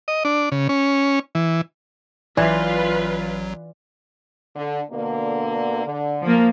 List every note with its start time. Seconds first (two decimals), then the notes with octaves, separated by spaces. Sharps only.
0.08 D#5
0.25 D4
0.52 C#3
0.69 C#4
1.35 E3
2.37 A1 E3 F#3 F4 B4 D5
4.55 D3
4.91 B2 D3 A#3
5.86 D3
6.22 F3 A#3